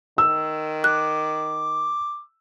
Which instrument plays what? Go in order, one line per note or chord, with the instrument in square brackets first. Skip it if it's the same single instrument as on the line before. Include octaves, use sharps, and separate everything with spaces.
[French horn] D#3 [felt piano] E6
[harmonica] D6 [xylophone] F#6